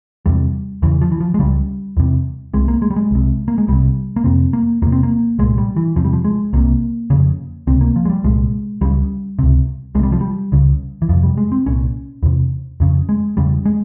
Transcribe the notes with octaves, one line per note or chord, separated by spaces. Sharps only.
E2 C3 G3
E2 C#3 E3
F3
E3
F3
G#3
C#2 C#3 G3
E2 C3
C2 C3 G#3
A#3
G#3
G3
G#3
C2 C3
A#3
G#3
C2 C3 G3
A#3
F2 C3 C4
A#3
E2 C3 A#3
C4
A#3
C2 A#2 G#3
G3
E3
E2 C3 F3
G3
F3
G#3
C2 C3 A#3
F2 C#3
C#2 C3 C4
A#3
F3
G#3
G3
C2 A#2 G#3
C#2 C#3 G3
C#2 C3
C2 C3 G3 G#3
F3
G3
C#2 C#3
E3
F2 C3 F3
G3
G#3
C4
C2 A#2 C#4
E2 C3
F2 C#3
G#3
E2 C#3 G3
G#3